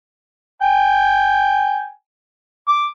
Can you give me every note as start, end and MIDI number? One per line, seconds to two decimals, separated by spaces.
0.62 1.90 79
0.62 1.90 80
2.68 2.87 86